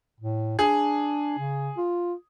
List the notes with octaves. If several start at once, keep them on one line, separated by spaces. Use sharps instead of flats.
A2
D4 G#4
C#3
F4